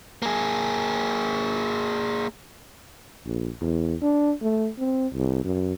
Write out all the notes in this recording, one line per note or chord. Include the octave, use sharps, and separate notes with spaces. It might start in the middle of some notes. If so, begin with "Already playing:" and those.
A#3 G#4
A#1
E2
D4
A3
C4
C2
F#2